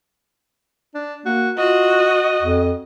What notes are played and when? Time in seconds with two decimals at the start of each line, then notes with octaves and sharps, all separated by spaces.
0.95 D4
1.26 A#3 F#4
1.58 F4 F#4 D#5
2.42 F2